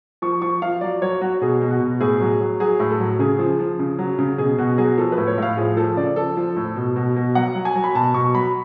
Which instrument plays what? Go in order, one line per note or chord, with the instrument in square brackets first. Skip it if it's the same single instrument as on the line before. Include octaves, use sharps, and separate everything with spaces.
[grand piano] F3 C#6
F3 C#6
F3 F5
F#3 D5
F#3 C#5
F#3 F#4
B2 G#4
B2
F#4
B2
A2 G#4
F#3
F#3
F#3 G#4
A2
A4
F#3
C#3 G#4
F3
F3
C#3
F#3
C#3
B2 G#4
B2 F#4
F#3 G#4
F3 A4
B4
A2
C#5
A2 F5
F3 G#4
F3 A4
C#3 D5
F3 A4
F3
A2
B2
B2
B2
F#3 F#5
F#3
G#5
F#3
B5
B2 A5
B2 C#6
F#3 B5